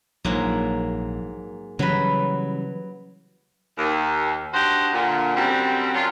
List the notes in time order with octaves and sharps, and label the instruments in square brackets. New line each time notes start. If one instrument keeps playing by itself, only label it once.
[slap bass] A#1 [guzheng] G#2 F#3 A#3
[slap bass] C#3 E3 G3 [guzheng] F#3 B4
[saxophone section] D#2
D4 D#4 F#4 G4 C5 F#5
A#2 D3
F#2 D3 G3 C4
F#2 F#3 D4 F4